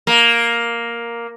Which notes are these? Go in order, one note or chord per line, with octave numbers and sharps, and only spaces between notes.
A#3